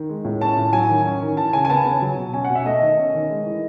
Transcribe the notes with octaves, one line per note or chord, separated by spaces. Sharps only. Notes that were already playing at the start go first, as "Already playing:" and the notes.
Already playing: D#3
G#3
A2
C#4 A5
A2
F#3 G#5
D#3
C#4
D#3
E3 A5
C#3 G#5
G#5
B3 A5
C#3
F#3
B2
C#4 G#5
F#5
B2
E5
A3 D#5
D#3
C#4
D#3
G#3
E3